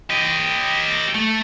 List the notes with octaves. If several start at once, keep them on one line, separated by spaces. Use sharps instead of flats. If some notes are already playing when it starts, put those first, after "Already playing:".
G4 D#5
A3